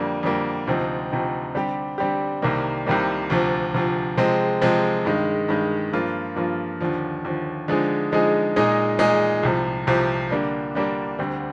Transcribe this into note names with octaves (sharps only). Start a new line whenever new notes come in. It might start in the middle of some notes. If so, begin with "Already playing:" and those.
Already playing: F2 D3 G3 A#3
F2 D3 G3 A#3
D2 C3 F3 C4 D#4
D2 C3 F3 C4 D#4
D3 G3 C4 G4
D3 G3 C4 G4
C2 C3 D#3 G3 A#3
C2 C3 D#3 G3 A#3
D2 C3 F3
D2 C3 F3
C3 F3 G#3 C4
C3 F3 G#3 C4
G2 D#3 G#3
G2 D#3 G#3
G2 F3 A#3 F4
G2 F3 A#3 F4
D#2 D3 F3
D#2 D3 F3
D3 F3 G#3 D#4 G#4
D3 F3 G#3 D#4 G#4
A#2 G#3 D#4 G#4
A#2 G#3 D#4 G#4
C2 C3 F3
C2 C3 F3
D3 G3 A#3 D4
D3 G3 A#3 D4
D2 D3 G3 C4